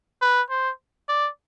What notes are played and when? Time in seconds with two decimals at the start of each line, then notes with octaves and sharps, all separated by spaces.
0.21 B4
0.50 C5
1.08 D5